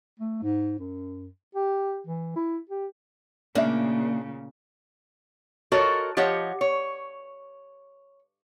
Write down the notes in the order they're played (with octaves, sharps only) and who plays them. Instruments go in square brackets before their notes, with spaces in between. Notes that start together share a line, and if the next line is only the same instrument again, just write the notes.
[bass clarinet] A3
G#2
F#2
G4
E3
E4
G4
[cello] A#2 C#3 [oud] A#3 [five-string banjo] D4 E5
[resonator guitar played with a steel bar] F4 F#4 A4 A#4 C#5 D#5
F3 G4 C#5 D#5 F#5
C#5